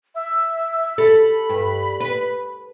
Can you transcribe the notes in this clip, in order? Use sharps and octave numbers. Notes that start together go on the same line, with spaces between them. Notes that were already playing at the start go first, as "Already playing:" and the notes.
E5
A4 B5
G2
B4